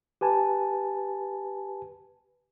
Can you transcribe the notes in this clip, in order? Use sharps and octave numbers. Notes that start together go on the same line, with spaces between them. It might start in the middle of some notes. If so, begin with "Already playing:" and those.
G4 B4 G#5 A5